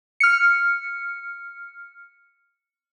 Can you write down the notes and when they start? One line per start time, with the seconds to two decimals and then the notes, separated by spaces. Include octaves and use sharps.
0.20 F6 C#7